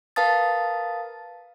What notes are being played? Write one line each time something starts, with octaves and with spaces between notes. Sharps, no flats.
A#4 B4 F5 A5 D#6 A6